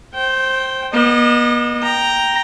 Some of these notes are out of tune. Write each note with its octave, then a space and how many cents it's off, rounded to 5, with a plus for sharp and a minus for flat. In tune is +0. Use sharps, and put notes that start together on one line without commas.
C5 +15 G5 -15
B3 -40 D#5 -25
G5 +0 A#5 +0